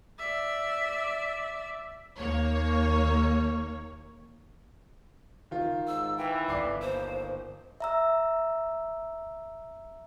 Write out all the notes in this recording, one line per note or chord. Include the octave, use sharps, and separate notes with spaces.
D5 E5
D#2 A#3 C#5
D#3 F4
G#2 E6
E3 G5
G1 D5 D6 C7
D#2 C5
E5 A#5 E6